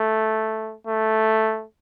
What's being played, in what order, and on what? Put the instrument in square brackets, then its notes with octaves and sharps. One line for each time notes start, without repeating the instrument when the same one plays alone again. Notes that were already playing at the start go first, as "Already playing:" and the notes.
Already playing: [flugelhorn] A3
A3